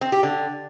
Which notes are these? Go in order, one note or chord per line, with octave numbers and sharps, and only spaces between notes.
C4
G4
D3